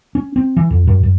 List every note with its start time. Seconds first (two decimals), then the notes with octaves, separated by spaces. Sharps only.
0.15 C#4
0.36 C4
0.57 E3
0.70 F2
0.87 F#2
1.03 F#2